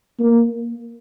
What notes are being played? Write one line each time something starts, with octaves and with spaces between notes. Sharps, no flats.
A#3